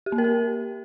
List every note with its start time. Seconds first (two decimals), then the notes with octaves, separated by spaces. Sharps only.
0.06 G4
0.12 A#3
0.18 A#4
0.24 G4